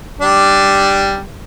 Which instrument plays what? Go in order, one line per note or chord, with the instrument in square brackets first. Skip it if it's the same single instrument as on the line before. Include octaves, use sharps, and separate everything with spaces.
[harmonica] G3 D4